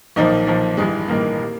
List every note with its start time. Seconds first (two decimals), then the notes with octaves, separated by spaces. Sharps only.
0.16 B1 A#2 D#3 F3 D#4
0.47 B1 A#2 F3
0.77 A1 G2 D#3 G#3 G#4
1.08 A1 G2 D#3 A#3 A#4
1.39 C3